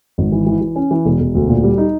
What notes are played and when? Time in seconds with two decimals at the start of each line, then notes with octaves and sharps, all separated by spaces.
0.18 G#1
0.32 E3
0.46 E3
0.61 E3
0.76 C#4
0.91 E3
1.06 E1
1.20 E1
1.35 D2
1.49 A#2
1.63 G3
1.78 D#4